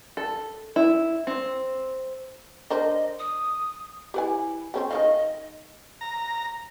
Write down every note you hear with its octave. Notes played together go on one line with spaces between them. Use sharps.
A4
E4
C4
D4 A#4 C5 D#5
D#6
E4 G4 B4 G#5
C4 C#4 G4
D#3 E3 D#5 F5
A#5